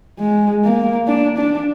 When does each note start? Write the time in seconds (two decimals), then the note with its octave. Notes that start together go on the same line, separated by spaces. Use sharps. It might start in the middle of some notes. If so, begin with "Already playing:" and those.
0.20 G#3
0.64 A#3
1.08 D4
1.38 D4